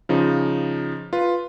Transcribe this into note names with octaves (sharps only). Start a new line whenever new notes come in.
C#3 F3 D#4
F4 B4